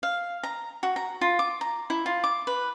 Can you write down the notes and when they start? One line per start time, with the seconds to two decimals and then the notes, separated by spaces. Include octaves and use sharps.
0.03 F5
0.43 A#5
0.83 F#4
0.96 A#5
1.21 F4
1.39 D6
1.61 A#5
1.90 E4
2.06 F4
2.24 D6
2.47 B4